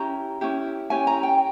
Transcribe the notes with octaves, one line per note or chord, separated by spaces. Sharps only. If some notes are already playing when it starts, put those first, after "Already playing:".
Already playing: C#4 E4 G4 A#5
C#4 E4 G4
C#4 E4 G4 G#5
A#5
G5